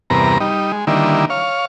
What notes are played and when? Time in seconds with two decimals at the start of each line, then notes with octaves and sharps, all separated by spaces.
0.10 E2 G2 C3 B3 A#4 A#5
0.40 G3 D#4
0.72 G#3
0.87 D3 D#3 G3 A#3 E4
1.30 C#5 F5